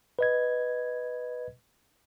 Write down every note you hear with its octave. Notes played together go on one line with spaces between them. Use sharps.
B4 D#5 G#6